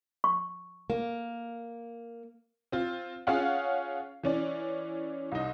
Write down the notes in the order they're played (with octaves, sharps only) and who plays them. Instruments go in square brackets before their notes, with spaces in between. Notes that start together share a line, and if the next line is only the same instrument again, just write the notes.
[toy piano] C#6
[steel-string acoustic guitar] A#3
[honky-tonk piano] C4 F4
C#4 F4 G#4 C#5 F5 F#5
E3 C#4 D5
C2 D#4